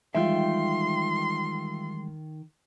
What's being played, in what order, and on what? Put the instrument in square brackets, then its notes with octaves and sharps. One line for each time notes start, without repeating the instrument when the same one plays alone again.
[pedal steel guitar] D#3 G5 [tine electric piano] E3 G3 G#3 [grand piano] F4 E5 [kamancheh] C6